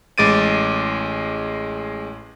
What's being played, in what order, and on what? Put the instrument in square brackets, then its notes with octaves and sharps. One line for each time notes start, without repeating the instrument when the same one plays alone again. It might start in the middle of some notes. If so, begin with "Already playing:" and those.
[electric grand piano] A1 G#3 D6 A6 D7 D#7